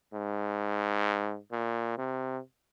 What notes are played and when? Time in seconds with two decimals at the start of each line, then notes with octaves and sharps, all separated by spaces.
0.13 G#2
1.51 A#2
1.97 C3